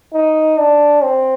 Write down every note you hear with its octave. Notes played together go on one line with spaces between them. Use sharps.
D#4
D4
C4